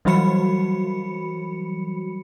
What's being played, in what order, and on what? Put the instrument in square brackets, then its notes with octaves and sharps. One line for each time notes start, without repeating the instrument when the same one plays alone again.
[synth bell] E3 F#3 G3 F#4 B5 C#7